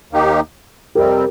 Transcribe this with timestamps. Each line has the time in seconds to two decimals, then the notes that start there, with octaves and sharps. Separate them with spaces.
0.11 D#2 D#3 A#3 D#4 G4
0.95 F2 C3 G3 C4 G4 A#4